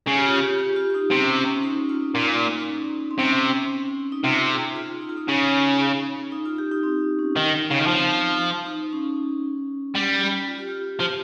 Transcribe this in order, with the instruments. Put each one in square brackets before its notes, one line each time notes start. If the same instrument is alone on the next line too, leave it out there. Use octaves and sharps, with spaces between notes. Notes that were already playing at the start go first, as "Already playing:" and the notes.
[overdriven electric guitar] C#3 [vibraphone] G#4
[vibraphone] G4
F4
G4
G4
F4
F4
D#4
[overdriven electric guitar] C3 [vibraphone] C#4
[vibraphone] C#4
D#4
C#4
F4
D#4
[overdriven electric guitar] A#2
[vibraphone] D#4
C#4
C4
[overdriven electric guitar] C3 [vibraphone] C#4
[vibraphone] D#4
[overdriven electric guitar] C3 [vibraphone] F4
[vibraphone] G#4
F4
D#4
F4
D#4
[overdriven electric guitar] C#3 [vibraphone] C#4
[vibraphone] D#4
F4
G4
D#4
C4
C#4
[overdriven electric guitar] D#3 [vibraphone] D#4
[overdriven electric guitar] C#3
D#3
[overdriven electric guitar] F3 [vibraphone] C4
[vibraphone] D#4
C#4
[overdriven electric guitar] G3
[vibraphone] F4
G4
F4
[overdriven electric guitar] F3